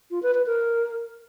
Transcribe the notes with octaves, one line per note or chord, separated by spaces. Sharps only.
F4
B4
B4
A#4